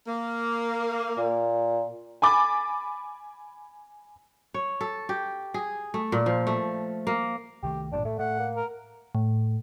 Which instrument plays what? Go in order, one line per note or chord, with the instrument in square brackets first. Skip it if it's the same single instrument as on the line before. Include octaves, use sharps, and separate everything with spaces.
[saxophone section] A#3
[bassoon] A#2
[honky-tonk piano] G#5 B5 D6 A6
[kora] C#5
A4
G4
G#4
A3
A#2
F3
A3
A#3
[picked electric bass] C2 D#3 A3 [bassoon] G4
[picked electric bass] A1 G2 A#2 [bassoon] D4
[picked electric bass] A2 [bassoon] A3
[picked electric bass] A2 [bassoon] A3 [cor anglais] F#5
[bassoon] A#3
[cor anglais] A#4
[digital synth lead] A2